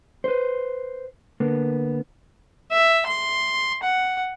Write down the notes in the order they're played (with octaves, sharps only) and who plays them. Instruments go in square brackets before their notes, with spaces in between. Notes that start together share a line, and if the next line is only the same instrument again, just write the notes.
[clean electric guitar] B4 C5
D3 A#3 B3
[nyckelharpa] E5
C6
F#5